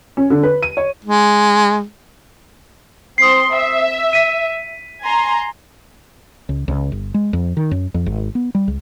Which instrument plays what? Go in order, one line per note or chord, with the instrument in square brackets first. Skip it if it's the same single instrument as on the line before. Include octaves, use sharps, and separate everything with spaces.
[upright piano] C#4
D3
B4
D#7
C#5
[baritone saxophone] G#3
[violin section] C4 C6 [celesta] D#6 C7
[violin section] E5
[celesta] B6 D#7
[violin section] G#5 A#5 C6
[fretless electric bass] C#2
C#2
G1
G#3
F2
D#3
F#2
F2
G#1
B3
G3
C#2